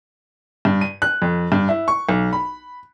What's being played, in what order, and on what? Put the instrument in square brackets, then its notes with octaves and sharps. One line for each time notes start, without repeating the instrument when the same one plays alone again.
[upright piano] G2
D#7
F#6
F2
G2
E4
C#6
B1
B5